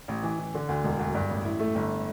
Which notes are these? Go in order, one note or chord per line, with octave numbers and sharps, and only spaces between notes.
A1
E3
E3
D3
D2
E1
D2
G2
A1
E4
A3
G1